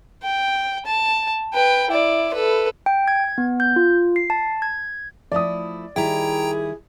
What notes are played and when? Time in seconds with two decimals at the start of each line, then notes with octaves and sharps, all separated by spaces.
0.23 G5
0.86 A5
1.54 B4 G5
1.90 E4 D5
2.34 A4 B4
2.86 G5
3.08 G#6
3.38 B3
3.60 G6
3.76 F4
4.16 C7
4.30 A5
4.62 G#6
5.32 F3 A3 E4 D5 D#6
5.96 D#3 G3 E4 G#4 G5 A#5